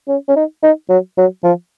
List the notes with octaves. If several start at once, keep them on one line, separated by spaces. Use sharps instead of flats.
C#4
C#4
D#4
D#4
F#3
F#3
F3